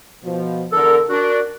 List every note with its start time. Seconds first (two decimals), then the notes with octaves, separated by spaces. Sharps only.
0.23 B2 F3
0.72 E2 D3 A4 A#4
1.09 D4 F#4 A#4